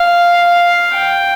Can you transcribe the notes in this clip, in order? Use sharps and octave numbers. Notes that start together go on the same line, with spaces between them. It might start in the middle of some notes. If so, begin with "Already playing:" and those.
Already playing: F5
G5